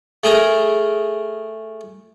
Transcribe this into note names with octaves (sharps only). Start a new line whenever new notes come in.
A3 G#4 A#4